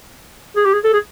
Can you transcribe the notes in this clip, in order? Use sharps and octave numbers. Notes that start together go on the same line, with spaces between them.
G#4
G4
G#4
A4
G#4